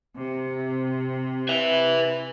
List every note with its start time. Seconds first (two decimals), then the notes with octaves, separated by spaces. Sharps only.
0.18 C3
1.49 B4 E5